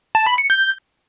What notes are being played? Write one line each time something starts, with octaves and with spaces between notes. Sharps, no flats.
A5
B5
C#7
G6